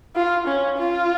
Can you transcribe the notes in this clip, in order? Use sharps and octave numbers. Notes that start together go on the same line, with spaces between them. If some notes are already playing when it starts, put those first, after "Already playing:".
F4
C#4
F4